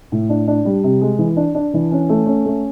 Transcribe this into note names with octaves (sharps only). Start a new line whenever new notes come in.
A2
D4
D4
G3
C3
G#3
E3
D4
D4
E3
C#4
A3
C#4
A3